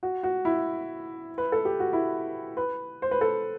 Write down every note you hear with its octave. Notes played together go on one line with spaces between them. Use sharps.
F#4
F#4
E4
B4
A4
G4
F#4
E4
B4
C5
B4
A4